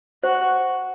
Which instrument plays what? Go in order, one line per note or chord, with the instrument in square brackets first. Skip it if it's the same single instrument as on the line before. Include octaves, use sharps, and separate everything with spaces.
[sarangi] F#4 [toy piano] C5